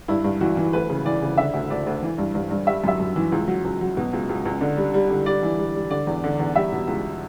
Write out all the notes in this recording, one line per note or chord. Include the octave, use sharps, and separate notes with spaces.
G2 E4
G2
E3 F#4
E3
D2 B4
C#3
E3 D5
C#3
D3 E5
D2
D2 D5
D2
E3
G2
G2
G2
G3 E5
F#2 E5
F#2
E3
C#2
F#3
C#2
F#3
B2
C#2
C#2
C#2
D3
G3
G3
D3
G3 D5
E3
G3
G3
D3 D5
E2
D3
E2
G3 E5
B2
C#2